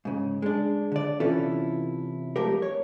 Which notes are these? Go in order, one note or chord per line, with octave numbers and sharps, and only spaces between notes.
G#2 C#3
G#3 D4
D3 D5
C3 E3 C#4 E4 F4 A4
F2 G#3 A3 G4 A#4
C#5